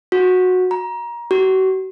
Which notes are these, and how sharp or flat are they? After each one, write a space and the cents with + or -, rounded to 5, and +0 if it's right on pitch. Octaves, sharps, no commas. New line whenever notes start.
F#4 -15
A#5 +25
F#4 +40